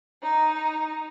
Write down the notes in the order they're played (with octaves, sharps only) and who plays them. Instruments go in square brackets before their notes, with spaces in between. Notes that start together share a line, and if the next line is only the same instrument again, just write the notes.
[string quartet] D#4